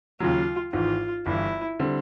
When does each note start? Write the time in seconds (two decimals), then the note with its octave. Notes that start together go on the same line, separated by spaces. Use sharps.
0.20 D#2 C#3 F#3 F4
0.73 G#1 G#2 E3 F4
1.26 G1 G2 E3 E4
1.80 D3 G3 C4